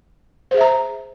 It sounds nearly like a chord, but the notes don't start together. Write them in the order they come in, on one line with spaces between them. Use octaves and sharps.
C5 G#4 E5 A#5